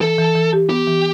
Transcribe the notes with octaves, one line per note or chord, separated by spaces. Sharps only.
E3 A4
E3
E3
G4
B3 G4
E3